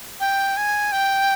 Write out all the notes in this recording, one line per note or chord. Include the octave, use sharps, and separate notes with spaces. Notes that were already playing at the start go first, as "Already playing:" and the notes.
G5
G#5
G5